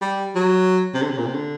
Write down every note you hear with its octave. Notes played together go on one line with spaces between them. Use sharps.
G3
F#3
C3
D3
C3
A#2
C3
D3